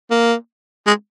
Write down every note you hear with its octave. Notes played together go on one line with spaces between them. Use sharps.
A#3
G#3